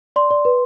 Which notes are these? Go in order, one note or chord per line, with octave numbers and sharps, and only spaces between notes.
D5 C6
D5
B4